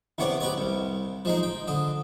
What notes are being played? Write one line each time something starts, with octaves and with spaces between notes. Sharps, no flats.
E2 C3 B3 C#5 D5
G4 B4 D#5 G#5
C2
F3 G#3 D#4
G5
D3 D#5